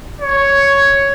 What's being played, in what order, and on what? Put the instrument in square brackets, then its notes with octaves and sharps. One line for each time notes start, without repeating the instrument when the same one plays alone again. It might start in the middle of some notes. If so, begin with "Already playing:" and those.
[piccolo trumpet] C#5